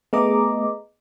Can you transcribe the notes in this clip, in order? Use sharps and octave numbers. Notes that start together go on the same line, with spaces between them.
A3 B3 G#4 D#5 A#5 D6